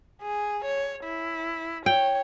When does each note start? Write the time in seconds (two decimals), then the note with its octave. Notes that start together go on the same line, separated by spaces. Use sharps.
0.22 G#4
0.65 C#5
1.04 E4
1.86 C#5 G5